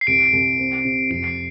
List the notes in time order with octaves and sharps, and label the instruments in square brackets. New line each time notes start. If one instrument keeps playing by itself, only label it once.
[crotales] C7
[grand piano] C2 [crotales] D7
[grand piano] C2
C4
C3
[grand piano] F2 [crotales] D7
[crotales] C7